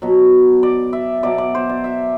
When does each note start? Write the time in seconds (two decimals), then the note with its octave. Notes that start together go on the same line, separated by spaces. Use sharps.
0.02 B2 F#3
0.63 D5
0.93 E5
1.23 B2 F#3 D5
1.38 D5
1.55 C5
1.69 D5
1.84 E5